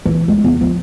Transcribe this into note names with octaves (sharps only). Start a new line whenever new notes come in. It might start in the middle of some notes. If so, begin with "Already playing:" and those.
E3
G#3
E2
F3